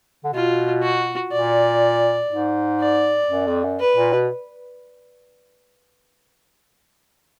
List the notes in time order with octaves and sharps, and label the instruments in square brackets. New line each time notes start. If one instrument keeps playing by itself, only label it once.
[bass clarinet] D3
[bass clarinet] B2 [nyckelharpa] F4
[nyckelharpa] F#4
[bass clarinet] A#2 [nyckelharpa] D5
[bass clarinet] G#2
[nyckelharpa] D5
[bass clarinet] F#2
F2
F#2
[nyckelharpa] B4
[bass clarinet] A#2
B2